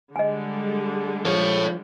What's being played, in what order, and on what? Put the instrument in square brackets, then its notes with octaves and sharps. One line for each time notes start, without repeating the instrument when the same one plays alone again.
[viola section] D3 G3 G#3 [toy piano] D#5 G#5
[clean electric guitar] F3 [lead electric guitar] A4 C#5